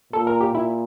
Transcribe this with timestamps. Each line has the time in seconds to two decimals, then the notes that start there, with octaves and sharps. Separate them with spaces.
0.13 A#2 A4
0.27 A#4
0.41 G4
0.54 A#2 E4